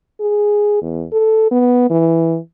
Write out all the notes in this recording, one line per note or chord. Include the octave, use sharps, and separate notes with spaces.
G#4
E2
A4
B3
E3